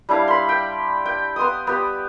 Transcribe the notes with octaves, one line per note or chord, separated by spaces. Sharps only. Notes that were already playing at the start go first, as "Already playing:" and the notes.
G3 D4 E4 F5
B5 C6
G5
G5
B3 C6 D#6
B3 G4